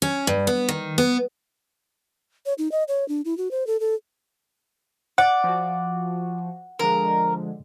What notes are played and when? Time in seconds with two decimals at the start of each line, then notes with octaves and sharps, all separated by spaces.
0.02 C#4
0.27 G2
0.47 B3
0.69 D#3
0.98 B3
2.46 C#5
2.58 D#4
2.72 D#5
2.88 C#5
3.08 D4
3.25 E4
3.37 F#4
3.51 C5
3.67 A4
3.80 A4
5.18 D5 F#5
5.44 F3 F#4
6.79 D3 F3 G#3 A#4